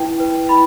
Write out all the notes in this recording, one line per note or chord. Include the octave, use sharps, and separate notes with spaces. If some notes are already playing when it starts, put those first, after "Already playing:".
Already playing: E4 B4 G5
B4
E4 B5